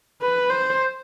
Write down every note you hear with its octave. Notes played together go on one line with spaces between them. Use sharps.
B4
C5